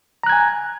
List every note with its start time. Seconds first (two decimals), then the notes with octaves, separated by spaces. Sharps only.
0.23 A#5
0.26 F#6
0.29 G#6
0.32 G#5